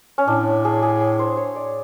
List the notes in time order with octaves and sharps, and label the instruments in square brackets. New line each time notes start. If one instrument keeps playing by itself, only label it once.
[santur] C#4
[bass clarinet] A2 [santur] D4
[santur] G#4
G#4
C5
C#5
D5